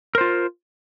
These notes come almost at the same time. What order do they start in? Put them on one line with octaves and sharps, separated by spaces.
A#4 C5 F4